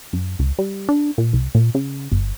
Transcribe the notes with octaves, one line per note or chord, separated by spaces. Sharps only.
F#2
C#2
G3
D4
A#2
C2
A#2
C#3
G1